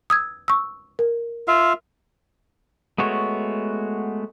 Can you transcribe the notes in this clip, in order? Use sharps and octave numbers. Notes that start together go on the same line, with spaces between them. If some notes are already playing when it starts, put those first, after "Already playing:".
D#6 E6 G#6
C#6 E6
A#4
F4 E5 F5
G#3 A3 B3 F#4 C#5